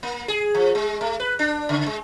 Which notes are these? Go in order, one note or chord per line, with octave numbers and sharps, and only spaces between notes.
A#3
G#4
F3
G#3
A3
B4
D4
C#3
G#3